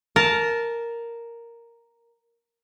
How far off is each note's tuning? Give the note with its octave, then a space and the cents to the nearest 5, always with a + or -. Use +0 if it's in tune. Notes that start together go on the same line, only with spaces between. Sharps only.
A#4 +0 A5 -15